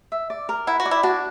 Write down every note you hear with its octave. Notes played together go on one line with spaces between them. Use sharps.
E5
D5
A#4
E4 F#5
F#4
D5
E4
D4 F#4